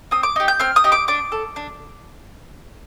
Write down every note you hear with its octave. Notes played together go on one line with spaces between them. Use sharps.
C4 D#6
D6
D#4 G4
G6
C4 F6
D#6
D#4 G4
D6
D4 D6
A4
D4